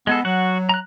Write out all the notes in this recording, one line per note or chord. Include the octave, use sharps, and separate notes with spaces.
G#3 B3 G#4 A4
F#3 F#4 F#5
A#5 F#6